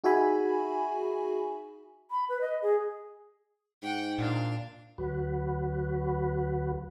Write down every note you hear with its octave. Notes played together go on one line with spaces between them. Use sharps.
D#4 F#4 G#4 E5 G#5 B5
B5
B4
D#5
G#4
G#2 F#5 G5
A#2 D4 F5
D2 F#3 F#4 B4